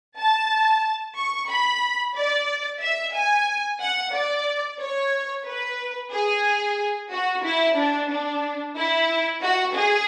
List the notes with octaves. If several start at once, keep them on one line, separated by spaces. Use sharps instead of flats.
A5
C#6
B5
D5
E5
G#5
F#5
D5
C#5
B4
G#4
F#4
E4
D4
D4
E4
F#4
G#4